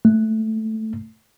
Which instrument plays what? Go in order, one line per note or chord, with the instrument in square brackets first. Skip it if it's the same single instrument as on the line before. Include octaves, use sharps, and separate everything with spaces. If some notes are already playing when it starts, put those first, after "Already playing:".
[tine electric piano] A3